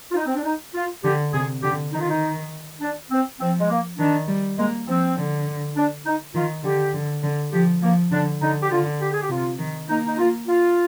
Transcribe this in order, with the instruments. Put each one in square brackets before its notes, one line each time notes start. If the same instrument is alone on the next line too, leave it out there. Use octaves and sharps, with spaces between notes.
[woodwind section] F4
D#4
C4
D4
D#4
F4
[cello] D3 [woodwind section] G4
[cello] C3 [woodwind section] G#4
[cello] D3 [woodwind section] G4
[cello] D#3 [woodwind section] D#4
[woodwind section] F4
D#4
D4
C4
[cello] F3 [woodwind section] C4
[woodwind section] G#3
A#3
[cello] D#3 [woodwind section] D4
[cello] G3
[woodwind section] G#3 [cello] A#3
[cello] F3 [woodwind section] C4
[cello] D3
[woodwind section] D4
D#4
[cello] D#3 [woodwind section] F4
[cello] D3 [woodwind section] G4
[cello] D3
D3
[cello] F3 [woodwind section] G4
[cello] F3 [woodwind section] A#3
[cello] D3 [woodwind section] D4
[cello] D3 [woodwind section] D#4
[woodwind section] G4
[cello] D3 [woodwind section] F4
[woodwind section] G4
G#4
G4
[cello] C3 [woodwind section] F4
[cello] D#3
[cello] A#3 [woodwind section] D#4
[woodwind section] D#4
F4
F4